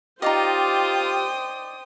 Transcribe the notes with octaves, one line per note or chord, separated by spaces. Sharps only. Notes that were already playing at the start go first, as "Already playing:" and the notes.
D#4 F4 G4 C5 D5 D#5 G5 D#6